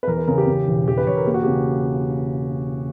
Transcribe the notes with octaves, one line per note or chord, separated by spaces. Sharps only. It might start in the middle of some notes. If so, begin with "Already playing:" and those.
B4
E2 A#4
B4
C#3 A#4
G4
C#3
E1
E1 G4
B4
E1 C#5
A#4
A#3 G4
F#4
C#3 G4